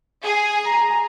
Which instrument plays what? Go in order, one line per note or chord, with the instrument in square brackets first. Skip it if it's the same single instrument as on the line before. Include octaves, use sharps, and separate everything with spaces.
[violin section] G#4
[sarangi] A#5